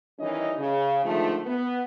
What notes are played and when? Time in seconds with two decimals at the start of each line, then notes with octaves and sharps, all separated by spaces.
0.19 D#3 E3 G3 C#4 D#4 D#5
0.58 C#3
1.04 D3 D#3 F3 G#3 A3
1.46 B3